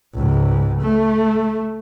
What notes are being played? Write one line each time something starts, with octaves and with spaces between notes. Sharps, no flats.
C#2 G#2
A3